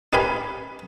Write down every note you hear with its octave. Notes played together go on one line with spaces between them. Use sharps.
D#4 G4 B4 F5 G#5 B5